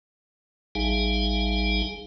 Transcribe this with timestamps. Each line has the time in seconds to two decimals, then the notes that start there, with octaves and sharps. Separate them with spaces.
0.75 A1 G3 D#4 G#4 F5 G#5